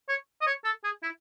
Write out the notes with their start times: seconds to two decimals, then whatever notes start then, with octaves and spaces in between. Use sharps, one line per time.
0.09 C#5
0.41 D#5
0.46 C#5
0.64 A4
0.84 G#4
1.02 E4